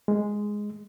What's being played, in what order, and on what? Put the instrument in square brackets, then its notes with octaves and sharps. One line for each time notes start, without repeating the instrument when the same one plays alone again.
[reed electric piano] G#3